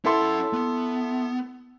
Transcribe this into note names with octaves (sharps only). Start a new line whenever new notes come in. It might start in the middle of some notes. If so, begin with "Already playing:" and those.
C#4 E4 A4 F#5 C6
B3